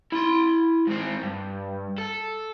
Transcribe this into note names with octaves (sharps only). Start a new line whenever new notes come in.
E4 C6
G#2 C4
G2
A4